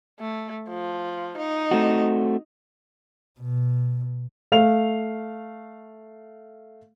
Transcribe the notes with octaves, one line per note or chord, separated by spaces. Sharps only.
A3
F3
D#4
A3 C4 F#4
B2
A3 F5 F7